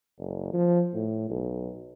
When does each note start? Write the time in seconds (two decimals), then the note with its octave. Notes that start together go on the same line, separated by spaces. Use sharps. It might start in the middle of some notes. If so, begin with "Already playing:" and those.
0.19 F#1
0.53 F3
0.94 A2
1.30 B1